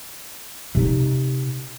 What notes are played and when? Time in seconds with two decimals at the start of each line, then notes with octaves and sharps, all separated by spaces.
0.75 C3 D#4